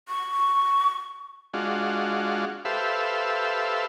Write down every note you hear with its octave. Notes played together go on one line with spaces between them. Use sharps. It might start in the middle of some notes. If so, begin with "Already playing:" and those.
C#6
G#3 D4 F4 F#4
G4 A4 B4 C5 E5 F5